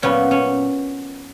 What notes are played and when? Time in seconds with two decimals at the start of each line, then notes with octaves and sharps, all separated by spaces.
0.02 A#2 F#3 B3 C#4
0.31 C#4